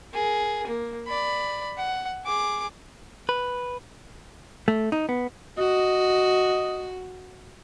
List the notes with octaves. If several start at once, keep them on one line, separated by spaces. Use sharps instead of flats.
G#4 A#4
A#3
D5 B5
F#5
G#4 D6
B4
A3
D#4
B3
F#4 D#5